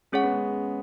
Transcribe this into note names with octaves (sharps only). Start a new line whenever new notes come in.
G#3 C#4 G#4 C#5 F#5
B3
G#3